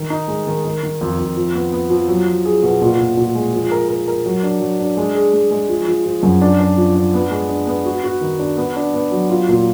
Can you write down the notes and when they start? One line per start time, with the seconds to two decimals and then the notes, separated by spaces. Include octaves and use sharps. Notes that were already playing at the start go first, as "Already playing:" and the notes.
Already playing: D#3
0.10 D#4
0.28 G#3
0.47 D#3
0.65 D#3
0.83 D#3
1.01 F2
1.19 F2
1.36 F3
1.55 B3
1.72 B3
1.90 F3
2.08 F#3
2.27 F#3
2.45 G#4
2.63 B2
2.81 A#2
2.98 A#2
3.17 A#2
3.35 G#3
3.53 F3
3.71 A#4
3.89 A#4
4.08 A#4
4.26 F#3
4.43 D4
4.61 F#3
4.80 D4
4.97 G#3
5.15 G#4
5.33 G#3
5.51 G#3
5.69 F3
5.88 F3
6.06 F3
6.23 F#2
6.42 D4
6.60 D4
6.77 F3
6.95 D4
7.14 B3
7.31 G#3
7.49 D4
7.67 B3
7.86 F#4
8.04 F#4
8.21 D#3
8.39 D4
8.57 B3
8.76 D4
8.94 B3
9.11 F#3
9.30 F4
9.48 A#2